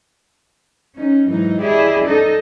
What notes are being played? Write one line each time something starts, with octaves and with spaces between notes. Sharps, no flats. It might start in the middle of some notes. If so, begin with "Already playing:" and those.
C#4 D#4
G#2 E3 F#3 D#4
E4 G4 G#4 D5 D#5
D#4 A4 D#5